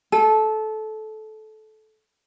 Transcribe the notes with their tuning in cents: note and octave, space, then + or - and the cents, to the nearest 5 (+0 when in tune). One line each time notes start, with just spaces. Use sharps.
A4 -20